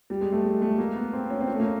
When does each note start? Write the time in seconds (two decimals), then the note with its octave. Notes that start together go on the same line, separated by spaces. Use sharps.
0.10 G3
0.21 G#3
0.32 A3
0.43 G#3
0.62 A3
0.78 A#3
0.95 B3
1.13 C4
1.30 C#4
1.41 C4
1.48 C#4
1.54 A3
1.60 A#3